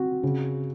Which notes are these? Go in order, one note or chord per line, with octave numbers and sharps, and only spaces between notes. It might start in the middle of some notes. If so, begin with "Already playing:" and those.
Already playing: C4 F#4
C#3